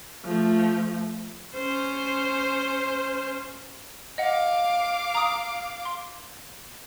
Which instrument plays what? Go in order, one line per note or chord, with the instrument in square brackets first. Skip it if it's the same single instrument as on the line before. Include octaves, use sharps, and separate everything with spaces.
[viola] F3 A3
C#4 C5
[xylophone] D#5 F#5 [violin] F5 D6
[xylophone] A#5 D#6
C6